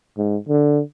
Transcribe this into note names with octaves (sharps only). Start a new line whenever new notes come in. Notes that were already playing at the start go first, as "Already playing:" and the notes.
G#2
D3